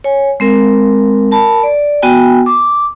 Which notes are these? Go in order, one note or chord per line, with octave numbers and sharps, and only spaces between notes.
C#5 G#5
G#3 C4 A#4
A#4 A5 B5
D5
B3 F#4 G5 G#5
D6